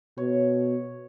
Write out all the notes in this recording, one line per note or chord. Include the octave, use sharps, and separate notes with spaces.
B2 C#5